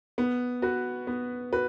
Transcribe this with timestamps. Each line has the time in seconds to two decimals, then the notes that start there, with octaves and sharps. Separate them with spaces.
0.18 B3
0.62 F#4 B4
1.07 B3
1.53 F#4 B4